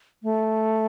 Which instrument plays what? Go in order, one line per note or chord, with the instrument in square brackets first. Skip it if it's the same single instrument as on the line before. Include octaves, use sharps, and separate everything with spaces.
[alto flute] A3